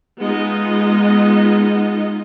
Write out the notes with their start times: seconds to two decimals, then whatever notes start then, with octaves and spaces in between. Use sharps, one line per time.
0.20 G#3 B3 D#4 F4 D#5